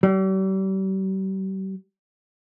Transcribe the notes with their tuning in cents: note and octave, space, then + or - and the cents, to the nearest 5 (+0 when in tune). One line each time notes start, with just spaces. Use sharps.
G3 -40